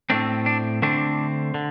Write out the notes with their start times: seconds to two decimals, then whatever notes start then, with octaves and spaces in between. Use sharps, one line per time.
0.10 A2 A3 C4 D4
0.46 D4
0.82 D3 A3 C4 D4
1.54 D3